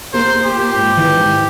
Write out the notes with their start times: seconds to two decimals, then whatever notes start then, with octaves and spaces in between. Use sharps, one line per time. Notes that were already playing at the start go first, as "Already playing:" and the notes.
0.13 A#3 C5
0.35 A#3
0.45 G4
0.55 F4
0.76 G#2
0.97 E3
1.17 G#2